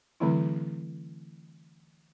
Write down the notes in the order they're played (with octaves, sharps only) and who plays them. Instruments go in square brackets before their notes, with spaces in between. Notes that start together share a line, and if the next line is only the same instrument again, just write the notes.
[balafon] D3 E3 F#3 A3 C4 E4